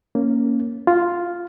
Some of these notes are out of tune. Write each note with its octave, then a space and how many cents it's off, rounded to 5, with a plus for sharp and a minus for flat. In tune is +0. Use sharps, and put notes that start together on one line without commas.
A#3 +0 C#4 +0
F4 +0 F5 +0